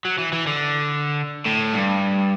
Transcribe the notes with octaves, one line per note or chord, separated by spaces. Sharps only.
F#3
E3
E3
D3
A2
G2